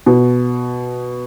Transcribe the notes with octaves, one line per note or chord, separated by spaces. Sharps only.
B2